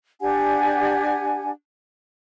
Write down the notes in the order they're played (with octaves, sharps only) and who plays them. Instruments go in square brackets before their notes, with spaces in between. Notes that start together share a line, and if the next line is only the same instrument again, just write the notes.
[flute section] D4 G4 F#5 G#5